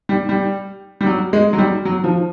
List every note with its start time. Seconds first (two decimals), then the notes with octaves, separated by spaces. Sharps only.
0.09 G3
0.29 G3
1.01 G3
1.06 F#3
1.33 G#3
1.53 F#3
1.58 G3
1.85 F#3
2.04 F3